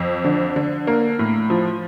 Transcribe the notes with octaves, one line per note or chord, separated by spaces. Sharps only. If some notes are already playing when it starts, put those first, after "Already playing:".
Already playing: F2
D3
D3
A#3
A2
F3